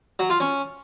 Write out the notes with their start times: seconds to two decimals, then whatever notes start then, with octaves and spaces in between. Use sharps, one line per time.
0.19 F#3
0.30 F4
0.40 C#4